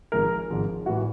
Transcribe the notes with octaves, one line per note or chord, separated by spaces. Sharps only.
G#1 G#2 F3 G#3 A#4
G#1 G#2 F3 G#3
A2 E3 G3 F#4